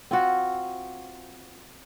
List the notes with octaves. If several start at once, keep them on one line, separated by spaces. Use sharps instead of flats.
C4 F4 F#4